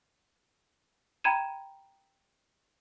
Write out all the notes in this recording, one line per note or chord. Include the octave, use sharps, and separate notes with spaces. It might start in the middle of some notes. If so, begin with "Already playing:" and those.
G5 A#5 B5 G#6 D#7 E7